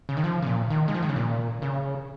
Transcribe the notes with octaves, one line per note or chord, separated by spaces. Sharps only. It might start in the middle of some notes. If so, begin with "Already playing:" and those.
C#3
D#3
F3
C#3
A#2
D#3
G#3
F3
D#3
C#3
A#2
C#3